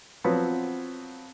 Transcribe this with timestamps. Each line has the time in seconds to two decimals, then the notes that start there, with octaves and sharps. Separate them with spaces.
0.24 F3 F#3 B3 C4